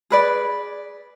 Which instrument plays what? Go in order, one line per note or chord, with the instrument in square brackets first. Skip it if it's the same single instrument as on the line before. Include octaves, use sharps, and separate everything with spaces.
[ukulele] G#4 B4 D5